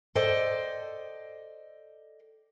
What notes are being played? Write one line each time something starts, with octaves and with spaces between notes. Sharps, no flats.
A4 C5 D5 D#5 G5